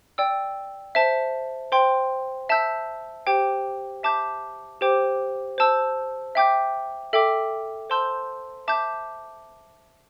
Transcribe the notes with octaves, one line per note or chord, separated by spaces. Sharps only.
D5 G5 E6
C5 E5 A5
C5 G5 C6
E5 A5 E6 G6
G4 C5 G5 D6
E5 A5 D6 G6
G4 C5 G5 D6
C5 A5 E6 G6
E5 G5 D6 G6
A4 E5 G5 D6
C5 A5 C6 E6 G6
E5 A5 D6 G6